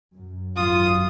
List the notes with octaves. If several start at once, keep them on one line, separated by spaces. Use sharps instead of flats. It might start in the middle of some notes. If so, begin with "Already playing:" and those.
F#2
G#1 F#2 F#3 F4 D#6